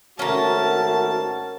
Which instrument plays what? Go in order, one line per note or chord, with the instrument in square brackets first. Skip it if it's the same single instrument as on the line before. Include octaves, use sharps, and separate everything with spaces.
[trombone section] G#1 A3 F#4 [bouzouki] C#4 A#5 [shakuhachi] A#4 [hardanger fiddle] A5